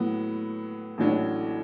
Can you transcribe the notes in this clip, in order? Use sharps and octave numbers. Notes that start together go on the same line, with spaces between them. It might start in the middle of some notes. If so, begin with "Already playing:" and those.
Already playing: A2 F#3 B3
A1 A2 F#3 D4